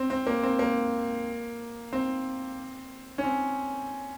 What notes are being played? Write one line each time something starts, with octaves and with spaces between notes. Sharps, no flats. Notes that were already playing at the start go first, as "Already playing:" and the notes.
Already playing: C4
C4
A#3
C4
A#3
C4
C#4
C4